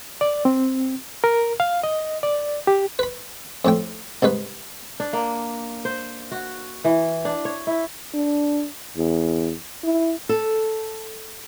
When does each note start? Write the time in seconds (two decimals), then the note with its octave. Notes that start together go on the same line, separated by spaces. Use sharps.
0.21 D5
0.45 C4
1.24 A#4
1.60 F5
1.83 D#5
2.23 D5
2.67 G4
2.99 B4 B5
3.65 F2 A2 G5
4.22 C2 G#2 D#4 B4
5.00 D4
5.13 A#3
5.85 C5
6.32 F#4
6.84 E3
7.25 D4
7.45 C#5
7.67 E4
8.14 D4
8.97 E2
9.84 E4
10.29 A4